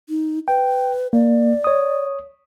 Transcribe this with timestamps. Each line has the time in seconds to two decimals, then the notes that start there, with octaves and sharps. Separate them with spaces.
0.09 D#4
0.48 B4 G5
1.13 A#3 D5
1.64 C#5 D#6